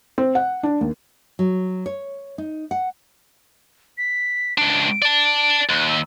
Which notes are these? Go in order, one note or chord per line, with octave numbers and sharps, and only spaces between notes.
C4
F#5
D4
D#2
F#3
C#5
D#4
F#5
B6
C#2 D4 D7
D5 A5
D#2 F#6
E6